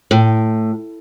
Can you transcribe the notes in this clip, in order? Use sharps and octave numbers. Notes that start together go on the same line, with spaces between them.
A2